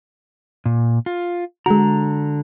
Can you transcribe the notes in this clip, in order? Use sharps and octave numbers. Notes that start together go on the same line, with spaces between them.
A#2
F4
D3 G#3 F#4 A#5